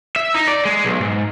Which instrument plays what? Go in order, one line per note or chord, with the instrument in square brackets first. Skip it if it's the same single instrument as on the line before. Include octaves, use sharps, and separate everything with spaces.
[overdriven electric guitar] E5
D#4
D5
G#3
B1
G#2